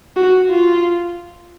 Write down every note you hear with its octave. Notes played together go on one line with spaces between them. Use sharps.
F#4
F4